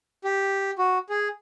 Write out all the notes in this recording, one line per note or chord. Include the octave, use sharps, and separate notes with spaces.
G4
F#4
G#4